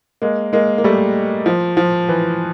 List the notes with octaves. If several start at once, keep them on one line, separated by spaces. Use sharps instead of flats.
G#3 A#3
G#3 A#3
A#3
G3 A3
F3
F3
E3